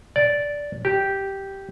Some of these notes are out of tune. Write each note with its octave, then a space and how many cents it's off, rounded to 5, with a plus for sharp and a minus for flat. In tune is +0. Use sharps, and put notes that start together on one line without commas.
D5 -10
G4 -5